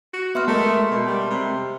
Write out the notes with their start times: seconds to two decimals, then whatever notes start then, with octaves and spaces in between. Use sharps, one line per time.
0.14 F#4
0.35 B3 E5 C6 F6
0.48 G#3 A3 A#4 D#5
0.91 B2
1.06 G3
1.30 C3